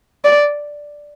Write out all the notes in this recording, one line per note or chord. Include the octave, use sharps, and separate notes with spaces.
D5